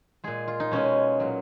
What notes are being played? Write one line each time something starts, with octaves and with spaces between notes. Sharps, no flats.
A#2 G#3 G#4
F4
D#4
B2 G#3 C#4
A#2 F#3